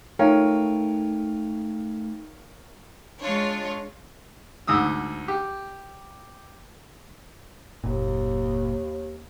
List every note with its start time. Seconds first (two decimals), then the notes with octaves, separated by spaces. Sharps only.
0.19 A3 D#4 F4 A#4 C#5 F5 G5
3.21 G#3 D4 F4 C#5
4.67 D2 G#2 D#6 E6
5.28 G4
7.84 F#1 D#2 A#2